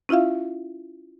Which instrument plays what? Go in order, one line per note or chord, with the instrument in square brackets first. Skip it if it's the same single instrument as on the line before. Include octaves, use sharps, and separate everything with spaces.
[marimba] C#4 E4 F4 E5 F5